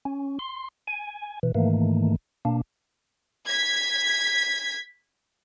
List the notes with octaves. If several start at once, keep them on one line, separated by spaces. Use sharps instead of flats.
C#4
C6
G#5
B2 E3
G#2 D#3 E3 A3 A#3
B2 A#3 D4
G#6 B6